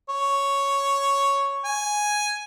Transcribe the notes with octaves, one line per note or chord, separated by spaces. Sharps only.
C#5
G#5